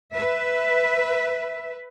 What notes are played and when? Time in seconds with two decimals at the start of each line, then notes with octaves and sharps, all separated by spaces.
0.13 B4 E5